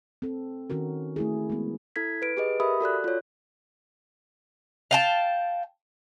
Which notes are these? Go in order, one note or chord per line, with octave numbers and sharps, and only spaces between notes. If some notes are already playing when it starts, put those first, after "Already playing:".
C4 A4
D#3 C#4 F#4 A#4
A3 E4 G#4
G#3 B3
E4 A4 G#6 B6
B4 D7
G4 G#4 B4 D#5
G4 A#4 E5 B5 D#6
F#4 A4 D5 F#6
F4 C#5
F5 G5 A5